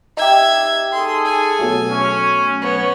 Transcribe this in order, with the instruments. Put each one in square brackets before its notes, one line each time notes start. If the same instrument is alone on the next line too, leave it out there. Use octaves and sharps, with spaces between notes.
[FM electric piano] D#4 G4 [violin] E5 G#6
[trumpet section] G#4 A4 [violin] C6
[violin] G#5
[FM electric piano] B2 F#3 A3
[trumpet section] C#4
[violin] B3 [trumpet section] C#5